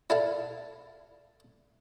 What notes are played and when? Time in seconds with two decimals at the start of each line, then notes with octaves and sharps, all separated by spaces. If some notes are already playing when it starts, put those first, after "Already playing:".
0.10 E4 A4 D5 F5